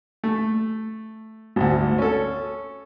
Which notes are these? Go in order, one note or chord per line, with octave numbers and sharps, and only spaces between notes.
A3
G#1 D2
C#4 A4